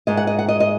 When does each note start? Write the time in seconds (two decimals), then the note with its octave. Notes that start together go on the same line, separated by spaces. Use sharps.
0.07 G#2 G#3 D#5
0.17 F#5
0.27 D#5
0.39 F#5
0.48 D#5
0.60 D#5